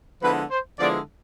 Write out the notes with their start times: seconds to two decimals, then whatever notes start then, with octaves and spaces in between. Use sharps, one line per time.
0.22 D3 F3 G#3 B3 E4 B4
0.51 C5
0.79 D3 F3 G#3 B3 E4 D5